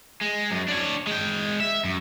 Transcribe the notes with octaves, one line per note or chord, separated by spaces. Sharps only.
G#3
F#2
D4 C#5
G#3 G5
E5
F#2